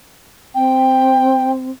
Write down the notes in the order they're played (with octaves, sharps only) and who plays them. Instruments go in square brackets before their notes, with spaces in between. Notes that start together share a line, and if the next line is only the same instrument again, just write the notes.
[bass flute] C4 [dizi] G5